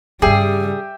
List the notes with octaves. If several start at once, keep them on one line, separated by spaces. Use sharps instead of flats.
G2 C#3 G3 G4 G#4 E5